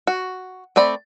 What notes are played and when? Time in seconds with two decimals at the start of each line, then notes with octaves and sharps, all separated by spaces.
0.07 F#4
0.76 A3 C4 D5 B5